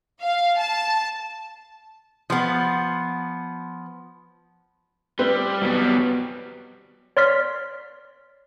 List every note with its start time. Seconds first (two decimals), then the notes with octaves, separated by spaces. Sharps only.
0.22 F5
0.58 A5
2.30 F3 B3
5.19 G3 C4 B4 C5
5.62 F#2 F#3 B3
7.17 C#5 D5 C6 F6 A6 B6